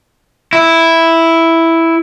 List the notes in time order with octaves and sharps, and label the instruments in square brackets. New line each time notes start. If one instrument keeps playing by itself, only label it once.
[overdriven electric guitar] E4